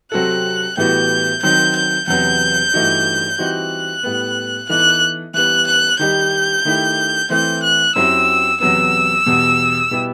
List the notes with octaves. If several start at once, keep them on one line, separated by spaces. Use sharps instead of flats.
C3 F#3 C4 F#4 A4 F#6
A2 E3 G3 B3 F#4 G6
D#3 F#3 C4 G6
G6
E2 C3 F#3 B3 G6
G2 E3 A3 D#4 F#4
E3 G3 C4 D#4 F#4 F#6
A2 G3 B3
E3 B3 D#4 A4 F#6
E3 G3 B3 F#6
F#6
D#3 G3 D#4 G4 G6
D#3 A3 E4 G4
E3 A3 C4 G6
F#6
F#2 F#3 C4 E4 G4 E6
E2 C3 F#3 B3 E6
E2 B2 G3 B3
B2 G3 B3 E4 G4